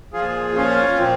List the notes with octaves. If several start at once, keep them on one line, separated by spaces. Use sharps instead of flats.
A#2 F3 F4 G#4
C#4 F4
A#2 F3 C4